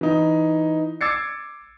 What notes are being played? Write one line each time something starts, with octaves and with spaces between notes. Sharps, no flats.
E3 D#4
D6 E6 G#6 A6 C7 C#7